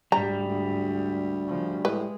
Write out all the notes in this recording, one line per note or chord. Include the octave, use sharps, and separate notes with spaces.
D2 G#2 G3 A#5
D2
C#3 F3
A2 G#3 B4